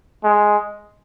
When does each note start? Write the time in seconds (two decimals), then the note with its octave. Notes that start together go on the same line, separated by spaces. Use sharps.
0.24 G#3